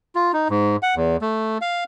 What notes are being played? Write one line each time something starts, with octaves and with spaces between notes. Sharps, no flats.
F4
D#4
G#2
F#5
E2
A3
F5